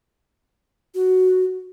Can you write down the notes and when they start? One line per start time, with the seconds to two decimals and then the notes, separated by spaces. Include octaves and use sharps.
0.95 F#4